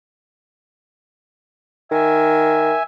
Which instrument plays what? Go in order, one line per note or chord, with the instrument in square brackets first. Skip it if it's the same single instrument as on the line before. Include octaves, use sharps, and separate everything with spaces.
[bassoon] D#3 [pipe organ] E5 G#5